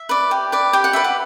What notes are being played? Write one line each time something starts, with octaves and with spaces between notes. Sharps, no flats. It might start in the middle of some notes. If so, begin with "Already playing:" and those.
Already playing: E5
B4 D5
G4
B4 D5
G4 G5
F#5
B4 D5 E5
F#5